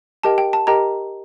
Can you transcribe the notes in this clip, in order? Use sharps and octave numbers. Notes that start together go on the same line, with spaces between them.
G4 A#4 D#5 G5 A5
G5
A5
G4 A#4 D#5 G5 A#5